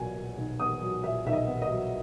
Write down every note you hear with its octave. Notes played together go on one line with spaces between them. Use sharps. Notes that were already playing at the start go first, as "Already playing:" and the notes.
Already playing: B1 A#2 F#3 B3 G#5
A#2
B1
B3 D#6
F#3
A#2 E5
B1 E5
D#5
B3
D#5
F#3